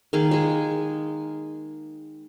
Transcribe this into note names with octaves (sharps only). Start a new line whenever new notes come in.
D#3 A#3 G#4
G#3 G#4